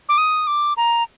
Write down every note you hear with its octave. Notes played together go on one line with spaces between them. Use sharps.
D6
D#6
D6
A#5